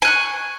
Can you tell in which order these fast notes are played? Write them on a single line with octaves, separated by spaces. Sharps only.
G#5 F#6 C#6